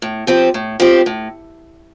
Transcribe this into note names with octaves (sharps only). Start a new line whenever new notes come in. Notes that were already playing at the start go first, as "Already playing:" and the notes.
A2
F3 C4 G4
A2
F3 C4 G4
A2